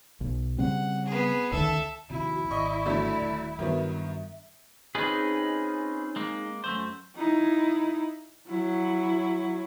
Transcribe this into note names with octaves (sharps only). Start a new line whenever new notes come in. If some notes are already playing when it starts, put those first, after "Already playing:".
B1
C#3 G3 C4 F#5
B3 G#4
C#2 D3 D#3 A4 E5
A#1 D#2 C3 E4 F#4
G#1 D5 D#5 C#6
D3 F#3 A3
D#1
G2 D#3 F#3 B3 E5
C4 C#4 D#4 F4 G#4 B4
G#3 A#3
F#2 A3 C5
D#4 E4
F#3 E4